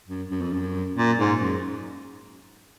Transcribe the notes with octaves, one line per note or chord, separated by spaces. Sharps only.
F#2
F#2
F2
F#2
A#2
G#2
F#2